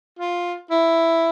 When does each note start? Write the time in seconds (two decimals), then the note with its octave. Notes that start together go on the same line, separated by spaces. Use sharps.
0.19 F4
0.71 E4